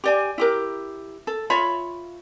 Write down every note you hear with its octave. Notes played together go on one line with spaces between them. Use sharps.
G4 D5 G#5
E4 G4 A#4
A4
F4 C#5 E5 B5